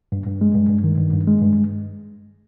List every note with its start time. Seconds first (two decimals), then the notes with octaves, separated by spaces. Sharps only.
0.12 G2
0.26 G2
0.41 G#3
0.55 G2
0.69 G2
0.84 D#3
0.98 G2
1.13 G2
1.27 G#3
1.41 G2